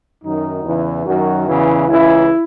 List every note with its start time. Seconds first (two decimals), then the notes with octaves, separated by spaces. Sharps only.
0.24 F#2 D#3 F#3 D#4
0.65 E2 C#3 E3
1.06 F#2 D#3 F#3 F#4
1.47 E2 C#3 E3
1.88 C#2 C#3 E3 E4